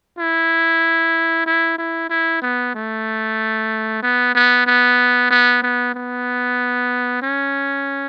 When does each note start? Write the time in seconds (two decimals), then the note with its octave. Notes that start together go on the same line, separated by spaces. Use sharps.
0.18 E4
1.46 E4
1.78 E4
2.10 E4
2.42 B3
2.75 A3
4.02 B3
4.35 B3
4.67 B3
5.31 B3
5.62 B3
5.95 B3
7.23 C#4